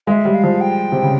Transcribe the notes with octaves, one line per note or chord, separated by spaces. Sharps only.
G#3 E5 F5
G3
F5
F3
G5
C3
C#3